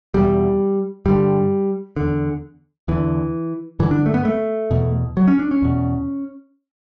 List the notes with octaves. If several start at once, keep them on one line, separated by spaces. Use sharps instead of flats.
E2 B2 G3
G2 D3 G3
E2 D3
E2 D3 E3
G2 D3 E3
D4
A3
B3
A3
E2 B2
F#3
C#4
D4
C#4
E2 B2